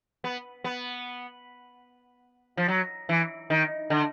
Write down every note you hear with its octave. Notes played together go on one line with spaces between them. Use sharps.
B3
B3
F3
F#3
E3
D#3
D3